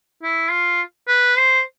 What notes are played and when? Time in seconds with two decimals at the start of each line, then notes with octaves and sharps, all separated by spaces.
0.23 E4
0.51 F4
1.08 B4
1.37 C5